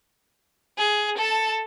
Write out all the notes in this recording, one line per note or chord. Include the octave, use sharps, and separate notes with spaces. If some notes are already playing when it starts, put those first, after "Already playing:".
G#4
A4 A5